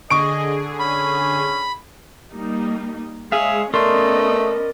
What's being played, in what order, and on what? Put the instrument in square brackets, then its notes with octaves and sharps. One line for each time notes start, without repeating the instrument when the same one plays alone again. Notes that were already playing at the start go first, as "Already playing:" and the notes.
[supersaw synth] D3 G#4 [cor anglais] D#5 [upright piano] C#6 D7
[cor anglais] C#4 [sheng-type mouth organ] B5
[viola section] G3 A#3 D#4
[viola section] G#3 C#5 [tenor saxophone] G#4 [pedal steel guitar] E5 F5
[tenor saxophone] A3 [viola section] B3 C#4 D#5 [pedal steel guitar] A#4 D5 C6